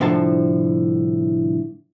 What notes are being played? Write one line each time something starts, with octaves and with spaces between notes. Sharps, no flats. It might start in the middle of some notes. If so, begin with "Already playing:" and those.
C2 A2 D3 F3 C5 A5